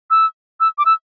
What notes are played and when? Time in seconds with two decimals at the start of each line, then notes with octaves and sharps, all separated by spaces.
0.10 E6
0.60 E6
0.78 D6
0.85 E6